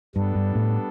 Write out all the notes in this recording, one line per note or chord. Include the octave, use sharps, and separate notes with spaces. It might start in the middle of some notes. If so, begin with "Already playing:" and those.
G2 G3 B3 D4 A4
G2
A2